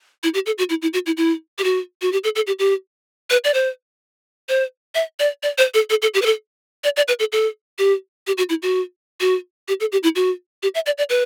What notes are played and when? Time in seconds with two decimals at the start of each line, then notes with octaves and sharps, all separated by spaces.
0.23 E4
0.34 G4
0.46 A4
0.58 F#4
0.70 E4
0.82 E4
0.93 F#4
1.06 E4
1.17 E4
1.58 G4
1.64 F#4
2.02 F#4
2.12 G4
2.24 A4
2.36 A4
2.47 G4
2.59 G4
3.30 B4
3.44 D5
3.54 C5
4.49 C5
4.95 E5
5.20 D5
5.43 D5
5.58 C5
5.74 A4
5.90 A4
6.02 A4
6.14 G4
6.22 B4
6.26 A4
6.84 D5
6.97 D5
7.08 B4
7.19 A4
7.32 A4
7.79 G4
8.27 G4
8.38 F#4
8.49 E4
8.62 F#4
9.20 F#4
9.68 G4
9.80 A4
9.92 G4
10.03 E4
10.16 F#4
10.63 G4
10.75 E5
10.86 D5
10.98 D5
11.10 B4